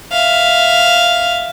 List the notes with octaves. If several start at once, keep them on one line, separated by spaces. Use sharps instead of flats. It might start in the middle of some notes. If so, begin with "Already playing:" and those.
E5 F5